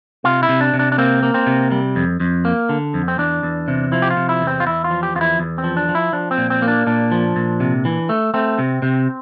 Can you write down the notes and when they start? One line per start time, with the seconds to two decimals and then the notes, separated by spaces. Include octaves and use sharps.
0.24 C3 F4
0.43 E4
0.49 C3
0.61 D4
0.74 C3
0.79 D4
0.92 D4
0.98 A#3 C4
1.23 A#3
1.34 C4
1.47 C3
1.72 G3
1.96 F2
2.20 F2
2.45 A#3
2.69 D3
2.94 F2
3.08 C4
3.18 E2 D4
3.43 E2
3.68 C3
3.92 F3 E4
4.02 G4
4.10 F4
4.17 C3
4.29 E4
4.41 E2
4.47 C4
4.60 F4
4.66 E2 E4
4.84 F4
4.91 F3
5.03 G4
5.15 E2 F4
5.21 E4
5.39 E2
5.58 C4
5.64 F3
5.77 D4
5.89 F3
5.95 E4
6.13 F3 D4
6.31 C4
6.38 A#2
6.50 C4
6.62 A#3
6.68 D4
6.87 A#2 D4
7.12 F3
7.36 A#2
7.60 C3
7.85 E3
8.09 A3
8.34 A3 C4
8.59 C3
8.82 C3